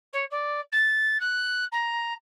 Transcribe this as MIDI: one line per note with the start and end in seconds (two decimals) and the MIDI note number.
0.13 0.24 73
0.30 0.60 74
0.72 1.20 93
1.20 1.64 90
1.72 2.13 82